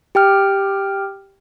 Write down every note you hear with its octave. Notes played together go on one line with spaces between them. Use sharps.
G4 G5 F6